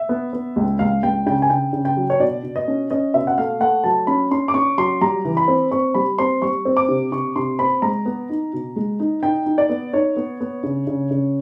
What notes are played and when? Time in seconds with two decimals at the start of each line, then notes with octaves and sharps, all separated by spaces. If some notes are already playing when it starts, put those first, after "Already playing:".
Already playing: E5
0.09 B3
0.33 B3
0.56 C#2
0.79 C#2 F5
1.03 C#2 G5
1.26 C#3 G5
1.42 G#5
1.50 C#3 G5
1.73 C#3
1.85 G5
1.97 F#3
2.10 C#5
2.20 B2 D5
2.43 B2
2.56 D#5
2.68 C#4
2.91 C#4 D#5
3.14 B2 E5
3.27 F#5
3.37 A3 F5
3.60 A3 F#5
3.84 F#3 A5
4.07 C#4 B5
4.31 C#4 C6
4.48 D6
4.54 C#4 C#6
4.78 F#3 C6
5.01 G3 A#5
5.25 E3
5.37 B5
5.48 C4
5.71 C4 C#6
5.94 G3 B5
6.18 C4 C6
6.42 G3 C#6
6.65 C4
6.77 D6
6.89 C3
7.12 C3 C#6
7.36 C3 C6
7.59 C4 B5
7.82 G#3 A#5
8.06 B3
8.29 D#4
8.53 B2
8.76 G#3
9.00 D#4
9.23 D#4 G5
9.46 D#4
9.58 D5
9.69 B3
9.93 D#4 C#5
10.16 B3
10.41 B3
10.63 C#3
10.87 C#3
11.11 C#3